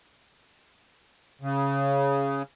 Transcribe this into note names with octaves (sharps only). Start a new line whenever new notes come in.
C#3